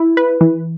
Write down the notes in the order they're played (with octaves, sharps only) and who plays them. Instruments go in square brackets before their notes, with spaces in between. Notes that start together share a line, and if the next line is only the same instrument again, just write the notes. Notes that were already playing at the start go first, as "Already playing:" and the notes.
Already playing: [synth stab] E4
B4
E3